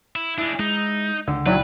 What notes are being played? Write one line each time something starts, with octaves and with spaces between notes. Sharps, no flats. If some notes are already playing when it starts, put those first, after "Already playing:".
E4
G#3 D4 E4
G#3 D#4
C#2 D3
C#2 A#2 D#3 F#3 D4 E4 B4 G5